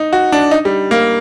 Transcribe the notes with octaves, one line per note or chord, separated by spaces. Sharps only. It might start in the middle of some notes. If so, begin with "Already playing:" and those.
Already playing: D#4
F#4
D4
D#4
G3
A#3